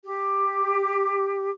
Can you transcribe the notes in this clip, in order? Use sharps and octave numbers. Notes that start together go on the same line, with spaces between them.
G4